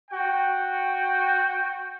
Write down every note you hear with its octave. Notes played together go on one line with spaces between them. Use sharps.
F#4 G5